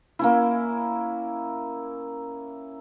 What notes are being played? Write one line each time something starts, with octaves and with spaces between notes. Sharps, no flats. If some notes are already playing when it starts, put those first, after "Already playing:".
A#3 C#4 E4